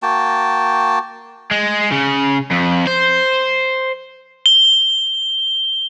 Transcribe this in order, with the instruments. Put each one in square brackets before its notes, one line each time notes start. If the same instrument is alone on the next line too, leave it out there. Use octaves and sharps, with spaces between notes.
[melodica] A#3 F#4 G5 A5
[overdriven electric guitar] G#3
C#3
F2
C5
[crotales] G7